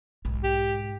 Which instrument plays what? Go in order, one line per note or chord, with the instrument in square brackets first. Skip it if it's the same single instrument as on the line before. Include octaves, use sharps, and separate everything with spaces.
[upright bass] B1 G#2
[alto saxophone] G4